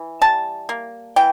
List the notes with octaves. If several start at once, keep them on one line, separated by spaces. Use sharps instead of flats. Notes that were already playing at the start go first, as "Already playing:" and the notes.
Already playing: E3
G3 A5
A#3
E3 G5